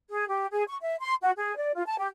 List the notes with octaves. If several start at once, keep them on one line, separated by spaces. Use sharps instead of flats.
G#4
G4
G#4
C#6
E5
C6
F#4
G#4
D5
F4
A5
G4